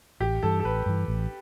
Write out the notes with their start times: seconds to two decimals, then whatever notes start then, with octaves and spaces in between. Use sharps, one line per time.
0.20 A1 G4
0.43 G2 E3 A4
0.60 A4
0.64 A1 B4
0.86 G2 E3
1.08 A1